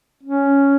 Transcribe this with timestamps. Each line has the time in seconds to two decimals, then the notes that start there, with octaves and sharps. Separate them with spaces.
0.23 C#4